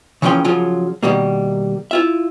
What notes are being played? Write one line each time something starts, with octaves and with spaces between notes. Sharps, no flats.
C#3 E3 F3 A#3 C#4 G5
C#3 F3 F#3 F4
B2 D#3 G3 A#3
E4 F4 E5